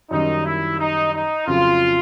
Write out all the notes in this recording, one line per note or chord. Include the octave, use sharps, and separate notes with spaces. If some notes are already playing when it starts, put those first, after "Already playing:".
F#2 D#3 G3 D#4
E4
D#4
D#4
F2 C#3 F#3 F4